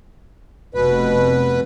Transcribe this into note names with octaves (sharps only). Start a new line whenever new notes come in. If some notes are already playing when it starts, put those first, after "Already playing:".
F1 B2 B4